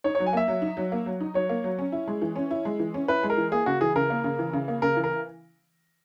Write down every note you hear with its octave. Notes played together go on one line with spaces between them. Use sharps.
D#4 C#5
C#5
F#3
G#5
A#3 E5
F#3
D#4
F#3
A#3
F#3
D#4
F#3 C#5
A#3
F#3
C#4
E4
G#3
E3
C#4
E4
G#3
E3
C#4
E4 B4
G#3
A#4
E3
A#3 G#4
C#3 F#4
E3 G#4
C#3 A#4
A#3
C#3
E3
C#3
A#3
C#3 A#4
E3
A#4